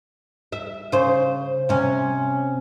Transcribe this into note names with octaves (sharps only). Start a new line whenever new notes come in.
E5
C#3 C5
C3 C#4